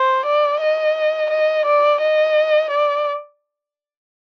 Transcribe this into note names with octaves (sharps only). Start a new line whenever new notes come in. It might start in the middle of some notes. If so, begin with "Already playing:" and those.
Already playing: C5
D5
D#5
D#5
D5
D#5
D5